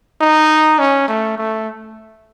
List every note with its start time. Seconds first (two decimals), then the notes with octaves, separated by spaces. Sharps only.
0.21 D#4
0.79 C#4
1.08 A3
1.38 A3